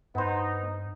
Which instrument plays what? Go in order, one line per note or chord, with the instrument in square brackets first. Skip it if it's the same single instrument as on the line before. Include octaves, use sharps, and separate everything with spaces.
[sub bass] G2 [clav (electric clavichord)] B3 C5 [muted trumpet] D#4